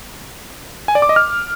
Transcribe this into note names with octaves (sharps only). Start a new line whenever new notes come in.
G#5
D5
D6
D#5
F6